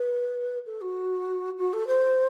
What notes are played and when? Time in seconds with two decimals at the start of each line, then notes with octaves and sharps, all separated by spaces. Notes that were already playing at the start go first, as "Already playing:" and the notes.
Already playing: B4
0.66 A4
0.81 F#4
1.57 F#4
1.73 A4
1.87 C5